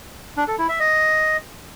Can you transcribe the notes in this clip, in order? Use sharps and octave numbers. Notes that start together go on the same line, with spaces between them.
D4
A4
E4
E5
D#5